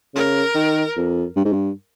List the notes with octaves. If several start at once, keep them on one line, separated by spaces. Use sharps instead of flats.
C#3 A#4
D#3
F2
G2
G#2
G2